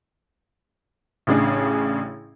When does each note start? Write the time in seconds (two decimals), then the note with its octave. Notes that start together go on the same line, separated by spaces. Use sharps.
1.27 A1 C#3 D4 G#4